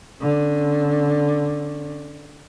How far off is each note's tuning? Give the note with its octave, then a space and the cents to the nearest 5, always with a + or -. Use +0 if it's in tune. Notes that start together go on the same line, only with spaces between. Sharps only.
D3 +0 C#4 -25